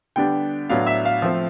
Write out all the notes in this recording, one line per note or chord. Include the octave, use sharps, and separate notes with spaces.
D3 G3 B3 D4 G5
A2 F#3 B3 D4 F5
E5
F5
F3 A3 C4